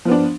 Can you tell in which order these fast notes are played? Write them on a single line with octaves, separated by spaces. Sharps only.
F3 B3 D4